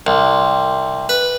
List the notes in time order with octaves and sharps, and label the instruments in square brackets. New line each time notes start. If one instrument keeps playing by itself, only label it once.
[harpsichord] C2
B4